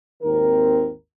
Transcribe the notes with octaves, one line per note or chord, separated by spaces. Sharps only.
G#1 D#2 D#3 C4 A#4